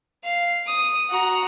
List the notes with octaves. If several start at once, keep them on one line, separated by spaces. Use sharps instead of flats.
F5
D#6
F#4 A#5